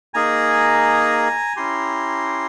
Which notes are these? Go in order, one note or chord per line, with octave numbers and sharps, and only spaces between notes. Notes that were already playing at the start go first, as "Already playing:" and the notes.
A#3 D#4 G#4 G#5 A#5
C#4 E4 G4 A#5 C6